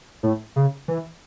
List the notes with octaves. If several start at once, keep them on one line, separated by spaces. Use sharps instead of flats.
A2
C#3
E3